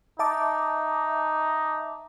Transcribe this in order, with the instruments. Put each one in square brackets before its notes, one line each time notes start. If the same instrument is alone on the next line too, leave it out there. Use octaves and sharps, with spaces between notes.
[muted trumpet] D#4 [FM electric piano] E5 A5 D6